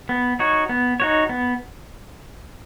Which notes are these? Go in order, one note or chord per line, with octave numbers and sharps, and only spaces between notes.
B3
D#4 F#4 C#5
B3
D#4 F#4 C#5
B3